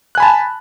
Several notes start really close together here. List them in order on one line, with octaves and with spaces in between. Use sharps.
F#6 G#5 B5 A5